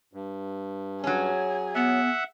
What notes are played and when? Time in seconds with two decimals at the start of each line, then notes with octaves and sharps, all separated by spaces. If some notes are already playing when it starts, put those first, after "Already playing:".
0.13 G2
1.04 F#3 C#4 G#4
1.75 B3 E5 F#5